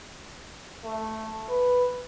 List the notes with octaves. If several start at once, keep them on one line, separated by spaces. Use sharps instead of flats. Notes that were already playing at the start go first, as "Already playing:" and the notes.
A3
B4